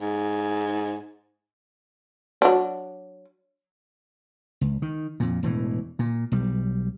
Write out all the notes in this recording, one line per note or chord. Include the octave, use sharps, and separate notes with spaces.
G#2
F#3 D4
C#2
D#3
F2 A#2
E1 A2 E3
A#2
B1 G3